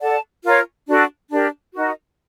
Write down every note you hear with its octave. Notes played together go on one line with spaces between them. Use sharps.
A4 D5 F#5 A5
F4 A#4 C#5
D4 F#4 A4
D4 G4 A#4
D#4 F#4 A#4 D#5